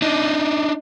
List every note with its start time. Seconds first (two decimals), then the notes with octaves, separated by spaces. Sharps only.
0.02 D4 D#4